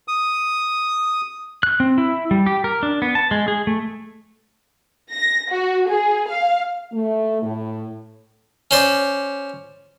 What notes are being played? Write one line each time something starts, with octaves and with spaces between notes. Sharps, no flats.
D#6
F#6
C4
E4
G3
G4
A#4
D4
B3
A5
G#3
G#4
A3
A#6
F#4
G#4
F5
A3
A2
C#4 C5 D5